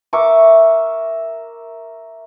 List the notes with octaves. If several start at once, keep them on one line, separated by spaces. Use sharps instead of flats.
A#4 E5 C#6 D6